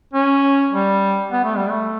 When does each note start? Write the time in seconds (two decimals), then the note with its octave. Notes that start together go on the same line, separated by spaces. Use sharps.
0.13 C#4
0.72 G3
1.32 B3
1.44 A3
1.57 G3
1.70 A3